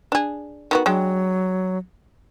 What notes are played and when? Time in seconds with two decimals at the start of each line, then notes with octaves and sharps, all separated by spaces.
0.12 D4 G#4
0.71 D#3 B3 F#4
0.86 F#3 G#3 D4 G5